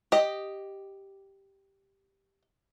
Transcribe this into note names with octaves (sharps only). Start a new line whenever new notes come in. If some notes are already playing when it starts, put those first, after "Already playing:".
G4 D#5